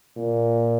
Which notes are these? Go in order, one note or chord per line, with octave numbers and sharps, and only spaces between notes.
A#2